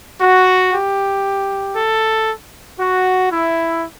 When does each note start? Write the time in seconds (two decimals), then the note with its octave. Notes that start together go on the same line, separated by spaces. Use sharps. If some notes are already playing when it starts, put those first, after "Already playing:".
0.22 F#4
0.73 G4
1.76 A4
2.80 F#4
3.31 E4